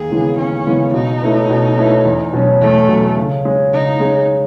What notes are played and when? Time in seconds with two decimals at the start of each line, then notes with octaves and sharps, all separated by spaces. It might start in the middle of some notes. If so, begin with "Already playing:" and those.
Already playing: D#2 G#4
0.10 C#3 E3 G#3 B3
0.38 D#2 C#4
0.66 C#3 E3 G#3 B3
0.94 B2 D#4
1.22 A3 C#4 E4 B4
1.50 B2
1.77 A3 C#4 E4 B4
2.05 E2
2.33 B2 F#3 C#4
2.61 E2 A3
2.89 B2 F#3 C#4
3.17 C#3
3.45 G#3 C#4 G#4 C#5
3.72 C#3 D#4
4.00 G#3 C#4 G#4 C#5